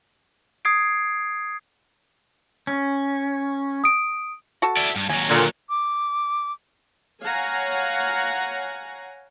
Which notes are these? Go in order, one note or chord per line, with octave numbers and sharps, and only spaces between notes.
D#6 G#6 C7 D7
C#4
D#6 D7
F#4 A4
E4 D5
G2
D#2 F#3 G#5
A#2 D3
D6
C#5 F5 F#5 G#5 A#5